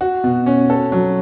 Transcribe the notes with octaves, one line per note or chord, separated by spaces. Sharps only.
F#4
B2
C#4
A4
F#3